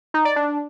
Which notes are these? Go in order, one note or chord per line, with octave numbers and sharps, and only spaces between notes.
D#4
D5
D4